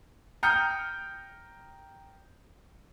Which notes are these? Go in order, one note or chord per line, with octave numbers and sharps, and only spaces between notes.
G5 A#5 D#6 F6 G6 C#7